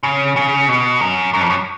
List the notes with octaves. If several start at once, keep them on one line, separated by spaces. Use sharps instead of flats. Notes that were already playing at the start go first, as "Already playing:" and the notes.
C#3
C#3
B2
F#2
F#2
F2
F#2